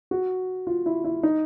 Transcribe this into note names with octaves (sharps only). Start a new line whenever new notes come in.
F#4
F4
E4
E4
D#4